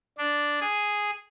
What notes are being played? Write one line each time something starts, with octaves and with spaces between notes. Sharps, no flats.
D4
G#4